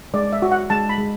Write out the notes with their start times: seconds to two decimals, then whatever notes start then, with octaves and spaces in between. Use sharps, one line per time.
0.14 G#3 D5
0.33 E5
0.42 F#4
0.51 F#5
0.70 G#3 A5
0.89 B5
0.98 G#3